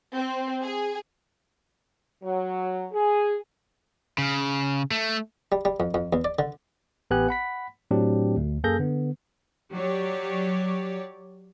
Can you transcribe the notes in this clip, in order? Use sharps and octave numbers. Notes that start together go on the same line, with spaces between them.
C4
G#4
F#3
G#4
C#3
A3
G3
G3
F2
F2
E2
D5
D3
A1 B3 G4 B4 G#5 F#6
F#5 B5 B6
A2 F#3 C4 D4 G4
D2
F#2 A#3 G#4 A4 G6 A#6
D3 B3
F#3 G4 C#5 D5